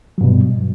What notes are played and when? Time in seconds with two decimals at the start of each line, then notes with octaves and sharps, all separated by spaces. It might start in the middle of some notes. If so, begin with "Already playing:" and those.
0.18 F#3
0.21 G2
0.24 B2